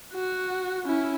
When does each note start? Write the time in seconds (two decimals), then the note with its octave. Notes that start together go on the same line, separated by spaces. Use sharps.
0.14 F#4
0.85 C#4 E4